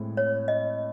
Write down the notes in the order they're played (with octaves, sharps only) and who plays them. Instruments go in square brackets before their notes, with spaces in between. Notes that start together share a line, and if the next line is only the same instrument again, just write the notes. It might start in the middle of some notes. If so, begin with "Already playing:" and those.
Already playing: [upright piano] A2 G#3 C4
[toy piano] C#5
D#5